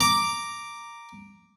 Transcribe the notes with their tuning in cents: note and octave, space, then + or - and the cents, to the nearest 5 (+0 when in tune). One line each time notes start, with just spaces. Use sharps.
A#5 +0 D6 +0